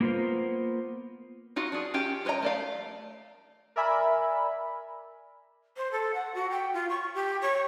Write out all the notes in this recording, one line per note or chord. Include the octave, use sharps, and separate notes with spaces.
A#3 B3 F4 A#4 C5
D#4 F4 F#4 F#5
D4 F4 G#4
C#4 F4 G4 G5
F4 B4 C#5 D#5 A#5
A3 D5 F5
A#4 D5 E5 G#5 B5
C5
A4
F#5
F#4
G5
F4
C#6
G4
C#5